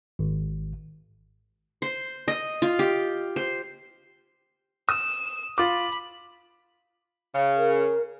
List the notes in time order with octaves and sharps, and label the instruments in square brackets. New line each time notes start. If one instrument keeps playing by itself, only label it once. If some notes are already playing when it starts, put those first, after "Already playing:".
[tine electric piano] G#1
[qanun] C5
D#5
F4
G4
C5
[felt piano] D#6 [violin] E7
[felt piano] F4 D6 [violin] B5
[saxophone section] C#3
[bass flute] A#4